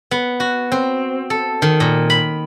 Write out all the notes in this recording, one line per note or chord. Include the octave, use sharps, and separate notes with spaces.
B3
F#4
C4
A4
D#3
A#2
B5